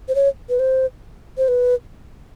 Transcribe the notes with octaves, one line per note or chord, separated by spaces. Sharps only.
C5
C#5
B4
C5
C5
B4